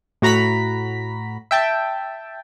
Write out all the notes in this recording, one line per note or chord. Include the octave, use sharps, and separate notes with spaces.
A2 F#4 A#5 B5 B6
E5 G5 A5